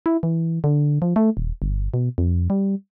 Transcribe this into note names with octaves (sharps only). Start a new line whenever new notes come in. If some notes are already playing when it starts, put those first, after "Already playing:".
E4
E3
D3
F3
A3
D#1
G1
B2
F2
G3